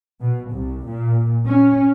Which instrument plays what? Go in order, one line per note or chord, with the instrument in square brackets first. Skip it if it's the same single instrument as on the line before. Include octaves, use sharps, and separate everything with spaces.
[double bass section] B2
C2
A#2
C#4